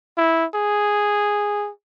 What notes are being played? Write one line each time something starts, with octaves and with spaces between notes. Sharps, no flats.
E4
G#4